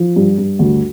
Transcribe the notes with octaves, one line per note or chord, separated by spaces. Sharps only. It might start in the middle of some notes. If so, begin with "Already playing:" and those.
Already playing: F3
G2
G2
D2